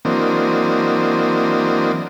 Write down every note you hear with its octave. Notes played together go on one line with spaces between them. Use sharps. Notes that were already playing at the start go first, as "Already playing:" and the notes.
E3 F#3 A#3 C4 D4 D#5